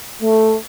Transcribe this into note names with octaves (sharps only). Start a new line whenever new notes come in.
A3